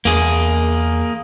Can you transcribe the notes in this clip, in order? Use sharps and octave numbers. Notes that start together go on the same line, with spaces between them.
E2 A#3 G#4